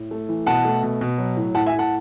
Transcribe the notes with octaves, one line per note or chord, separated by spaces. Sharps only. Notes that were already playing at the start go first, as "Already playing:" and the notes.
Already playing: A2
A3
E3
B2 F#5 A5
A3
B2
B2
F#3
A2
A2 F#5 A5
E5 G#5
A2
F#5 A5